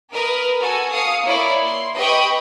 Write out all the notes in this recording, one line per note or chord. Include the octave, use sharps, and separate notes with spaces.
A#4 B4 D#6 F6
F#4 A4 G#5
F5 D#6 C#7
A#3 E4 C#5 D5
C6
G4 B4 D#5 G5 B5 C#6